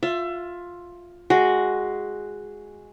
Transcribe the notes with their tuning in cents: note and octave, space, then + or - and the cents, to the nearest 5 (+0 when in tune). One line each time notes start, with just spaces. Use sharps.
F4 +10 E5 +25
G#3 +0 F#4 +0